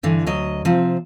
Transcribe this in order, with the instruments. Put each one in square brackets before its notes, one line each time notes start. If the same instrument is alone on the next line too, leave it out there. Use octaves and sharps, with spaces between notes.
[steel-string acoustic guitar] G2 D3 E3
D2 F#3 D#5
C3 F3 C4